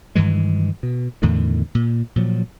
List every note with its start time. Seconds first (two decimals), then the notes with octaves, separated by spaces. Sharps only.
0.15 G2 D#3 E3 G#3
0.83 B2
1.22 E2 A2 D3 D#3
1.75 A#2
2.16 A#2 F3 F#3